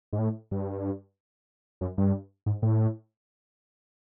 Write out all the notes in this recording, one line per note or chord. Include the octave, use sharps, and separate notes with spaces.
G#2
A2
G2
F#2
G2
G#2
A2